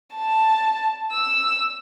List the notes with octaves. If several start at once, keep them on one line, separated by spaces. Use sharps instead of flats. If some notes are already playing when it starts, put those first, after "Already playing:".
A5
E6